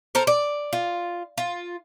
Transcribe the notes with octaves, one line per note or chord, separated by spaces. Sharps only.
A4 A#4 C5
D5
F4
F4